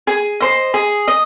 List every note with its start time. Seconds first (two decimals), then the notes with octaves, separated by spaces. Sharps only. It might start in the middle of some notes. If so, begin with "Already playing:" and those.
0.07 G#4 G#5
0.40 C5 D#5
0.74 G#4
1.08 D#5